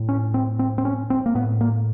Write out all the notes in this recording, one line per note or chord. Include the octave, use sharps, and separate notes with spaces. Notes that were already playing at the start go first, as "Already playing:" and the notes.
Already playing: A2
C#4
C4
C4
C4
C#4
C4
A#3
A2 B3
A#3